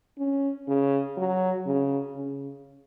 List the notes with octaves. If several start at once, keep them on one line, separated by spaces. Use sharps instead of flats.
C#4
C#3
F#3
C#3
C#3